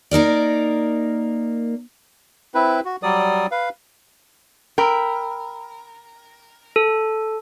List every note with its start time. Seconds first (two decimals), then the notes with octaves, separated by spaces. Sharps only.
0.11 A#3 D#4 A#4 D5
2.55 C4 E4 B4
2.85 F#4
3.03 F#3 G3 D5 D#6
3.51 B4 F5
4.78 A#4 G5 B5 E6
6.76 A4